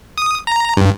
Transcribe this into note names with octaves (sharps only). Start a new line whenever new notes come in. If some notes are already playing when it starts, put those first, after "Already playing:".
D#6
A#5
G2